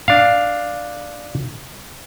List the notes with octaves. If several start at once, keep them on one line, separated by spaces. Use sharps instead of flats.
D4 F5